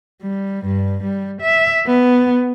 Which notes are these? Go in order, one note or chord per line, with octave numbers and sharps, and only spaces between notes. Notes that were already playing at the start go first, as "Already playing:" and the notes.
G3
G2
G3
E5
B3